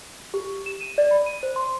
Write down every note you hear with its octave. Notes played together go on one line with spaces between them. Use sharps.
G4
E7
D#7
D5
B5
D#7
C5
C6